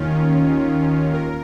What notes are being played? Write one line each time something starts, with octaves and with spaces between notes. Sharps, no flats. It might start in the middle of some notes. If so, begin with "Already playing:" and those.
Already playing: D#2 D#3 C#4 F4
A#4